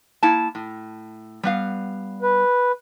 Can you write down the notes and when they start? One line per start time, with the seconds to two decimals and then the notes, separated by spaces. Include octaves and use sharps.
0.23 A#3 E4 A5
0.55 A2
1.43 G3 B3 F5
2.22 B4